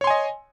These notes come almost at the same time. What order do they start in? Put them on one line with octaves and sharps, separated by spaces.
C#5 C6 G#5 D#5